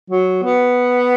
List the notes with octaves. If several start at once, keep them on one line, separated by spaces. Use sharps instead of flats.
F#3
B3